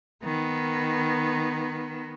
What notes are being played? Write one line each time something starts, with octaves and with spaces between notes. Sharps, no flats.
D#3 B3